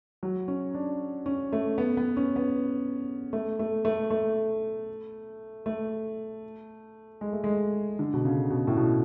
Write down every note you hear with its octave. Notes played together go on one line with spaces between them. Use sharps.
F#3
C#4
D4
C#4
A3
B3
B3
C#4
B3
A3
A3
A3
A3
A3
G#3
A3
G#3
D3
B2
C#3
B2
A2
B2